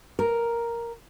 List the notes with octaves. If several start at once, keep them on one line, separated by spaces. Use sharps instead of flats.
A#4